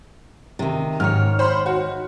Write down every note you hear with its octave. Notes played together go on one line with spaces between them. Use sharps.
C3 D#3
G#2 D#3 C#5 F6
C5 B5
F#4